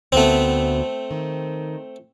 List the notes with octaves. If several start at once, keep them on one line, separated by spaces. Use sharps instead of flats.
D2 A3 B3 C4
D#3